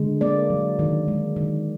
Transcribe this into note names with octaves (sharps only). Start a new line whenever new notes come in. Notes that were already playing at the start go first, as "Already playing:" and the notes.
Already playing: D3 G#3
A#3 D5
F#3
D#3
G#3
D#3